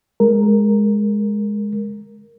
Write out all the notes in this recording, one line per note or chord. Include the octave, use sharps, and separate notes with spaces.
G#3 A#4